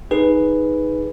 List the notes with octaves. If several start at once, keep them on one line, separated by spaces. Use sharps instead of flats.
D#4 G#4 B4